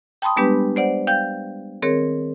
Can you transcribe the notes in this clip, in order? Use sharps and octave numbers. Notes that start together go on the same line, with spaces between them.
G5 A5 B5 C6 D#6
G3 G#3 B3 D4 G4 B4
C5 D5 F#5
F5 G5 G6
D#3 C4 G#4 A#4 C#5